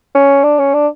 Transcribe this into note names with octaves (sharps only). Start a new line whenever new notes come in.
C#4
D4
C#4
D4